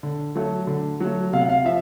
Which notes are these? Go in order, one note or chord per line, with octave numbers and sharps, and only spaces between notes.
D3
F#3 A3
D3
F#3 A3
C3 F5
F#5
F5
F3 E5